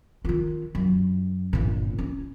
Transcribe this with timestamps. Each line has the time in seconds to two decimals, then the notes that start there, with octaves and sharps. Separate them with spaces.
0.25 D#3 F4
0.75 F#2
1.53 G1 A#2
1.98 C#4